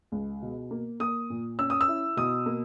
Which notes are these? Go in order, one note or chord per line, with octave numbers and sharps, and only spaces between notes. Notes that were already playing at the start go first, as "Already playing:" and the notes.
C#2
B2
A#3
A#3 D#6
A#2
C#4 E6
D#6
E6
E4
B2 D#6
A#3